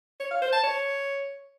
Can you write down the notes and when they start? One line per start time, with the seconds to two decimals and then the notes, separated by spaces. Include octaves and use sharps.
0.20 C#5
0.31 F5
0.42 C5
0.53 A5
0.64 C#5